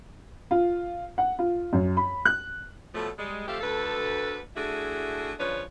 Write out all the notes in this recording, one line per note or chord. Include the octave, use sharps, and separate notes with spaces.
F4
F#5
F4
F#2
B5
F#6
B2 F3 F#3 A3
G3 G#3
F3 A3 C4 G4 A4 F5
D2 A4 B4
A3 D4 E4 F#4 G#4
C#3 F3 D4 B4 C#5